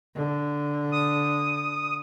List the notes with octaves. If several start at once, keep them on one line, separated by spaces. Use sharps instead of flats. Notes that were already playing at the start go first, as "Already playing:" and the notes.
D3
D#6